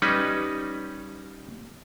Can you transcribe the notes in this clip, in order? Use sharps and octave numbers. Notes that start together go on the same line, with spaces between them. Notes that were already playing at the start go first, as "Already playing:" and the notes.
G3 C#4 D#4 B4